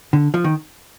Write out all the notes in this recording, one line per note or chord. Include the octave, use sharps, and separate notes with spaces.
D3
F3
D#3